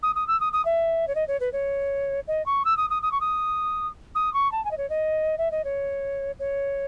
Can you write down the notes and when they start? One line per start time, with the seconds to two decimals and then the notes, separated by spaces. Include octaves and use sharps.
0.03 D#6
0.15 D#6
0.28 E6
0.40 D#6
0.53 D#6
0.65 E5
1.08 C#5
1.15 D#5
1.28 C#5
1.40 B4
1.53 C#5
2.28 D#5
2.46 C#6
2.65 E6
2.77 D#6
2.90 D#6
3.02 D#6
3.12 C#6
3.21 D#6
4.15 D#6
4.34 C#6
4.52 A5
4.65 G#5
4.71 D#5
4.77 C#5
4.90 D#5
5.38 E5
5.51 D#5
5.64 C#5
6.39 C#5